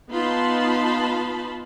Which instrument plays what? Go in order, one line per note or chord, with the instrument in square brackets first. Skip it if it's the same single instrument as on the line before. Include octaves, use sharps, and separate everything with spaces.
[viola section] B3 D#4 F4 A5 B5 C6